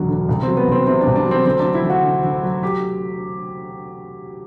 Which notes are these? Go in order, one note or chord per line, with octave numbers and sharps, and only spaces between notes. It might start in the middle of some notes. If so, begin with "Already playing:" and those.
Already playing: E1 D2 F#3
D3
C2
C4
F#3
B3
C2 C4
C3 C4
D4
C2
D4
F#3
C4
D2 C4
D4
F#3
E4
D2
F#4
D3
D2
F#3
G4